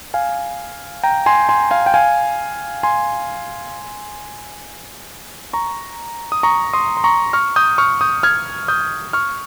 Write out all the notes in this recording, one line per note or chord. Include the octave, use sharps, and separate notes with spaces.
F5 G#5
G5 A#5
G#5 C6
G#5 C6
F5 G#5
G5
F5 G#5
G#5 C6
A#5 C#6
D#6
A#5 C#6
C6 D#6
C6
A#5 C#6
C#6 F6
D#6 G6
C#6 F6
D#6 G6
F6 G#6
D#6 G6
C#6 F6